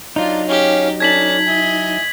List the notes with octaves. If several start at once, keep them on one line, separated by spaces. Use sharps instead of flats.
F#3 D4 D#4 F4
C#4 G4 C#5 F5
C#4 D4 A4 A5 G#6 B6 F#7
E4 D#5 G#5